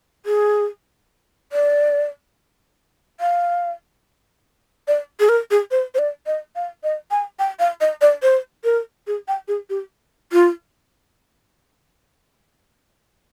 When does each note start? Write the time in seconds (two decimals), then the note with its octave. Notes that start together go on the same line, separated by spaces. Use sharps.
0.26 G#4
1.52 D5
3.20 F5
4.88 D5
5.20 G#4
5.29 A#4
5.51 G#4
5.71 C5
5.95 C5
5.99 D5
6.26 D#5
6.56 F5
6.84 D#5
7.11 G#5
7.39 G5
7.59 F5
7.81 D#5
8.01 D5
8.23 C5
8.64 A#4
9.07 G#4
9.28 G5
9.48 G#4
9.70 G4
10.32 F4